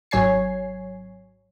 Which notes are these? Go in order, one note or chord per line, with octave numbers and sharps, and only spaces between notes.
G#1 F#3 C#5 G#5 G#6 C7